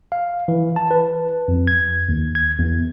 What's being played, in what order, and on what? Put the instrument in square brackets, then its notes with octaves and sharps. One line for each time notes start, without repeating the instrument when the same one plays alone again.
[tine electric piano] F5
E3
A5
B4
F2
G#6
D#2
G#6
E2